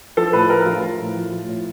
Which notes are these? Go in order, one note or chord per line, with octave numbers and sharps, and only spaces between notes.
F3 A4
A2 B4
F3 A#4
F3 F4
F3
A2
F3
F3
A2